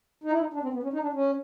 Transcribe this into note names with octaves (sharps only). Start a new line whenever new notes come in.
D#4
E4
D#4
D4
C4
B3
C#4
D#4
D4
C#4